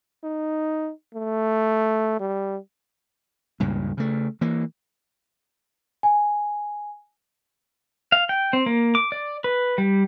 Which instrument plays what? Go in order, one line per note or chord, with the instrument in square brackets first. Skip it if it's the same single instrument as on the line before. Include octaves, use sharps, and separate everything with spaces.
[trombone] D#4
A3
G3
[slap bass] C#2 G2 A#2
C#3 A3
E3 A#3
[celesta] G#5
[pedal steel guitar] F5
G5
C4
A#3
D6
D5
B4
G3